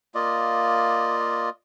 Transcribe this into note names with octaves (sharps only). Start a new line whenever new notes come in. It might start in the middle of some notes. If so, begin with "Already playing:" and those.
A#3 F4 D5 D#5